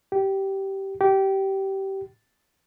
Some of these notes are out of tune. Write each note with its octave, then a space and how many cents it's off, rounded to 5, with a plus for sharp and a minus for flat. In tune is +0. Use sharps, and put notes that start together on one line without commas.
G4 -15
G4 -20